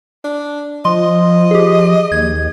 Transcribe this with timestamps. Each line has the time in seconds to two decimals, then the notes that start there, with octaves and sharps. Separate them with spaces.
0.24 D4
0.85 F3 D#5 C6
1.51 G4 G#4
2.12 D#2 G#6